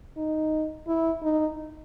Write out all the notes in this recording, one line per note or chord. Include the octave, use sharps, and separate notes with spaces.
D#4
E4
D#4